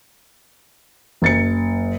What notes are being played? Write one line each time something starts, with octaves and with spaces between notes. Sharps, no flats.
F#1 A6 C#7